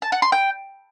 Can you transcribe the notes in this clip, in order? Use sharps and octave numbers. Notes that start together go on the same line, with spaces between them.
A5
F#5
C6
G5